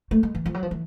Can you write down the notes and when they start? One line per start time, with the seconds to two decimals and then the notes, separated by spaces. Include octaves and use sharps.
0.11 A3
0.23 G#3
0.35 E3
0.46 F3
0.54 F#3
0.63 F3
0.71 E3